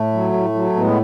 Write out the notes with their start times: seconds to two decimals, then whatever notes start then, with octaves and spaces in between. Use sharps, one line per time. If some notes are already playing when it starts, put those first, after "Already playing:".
Already playing: A2 A3
0.13 F#3
0.33 A2
0.55 F#3
0.75 A2 G#3 B3